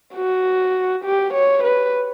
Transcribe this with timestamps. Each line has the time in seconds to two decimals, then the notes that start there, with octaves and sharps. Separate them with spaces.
0.15 F#4
1.04 G4
1.33 C#5
1.63 B4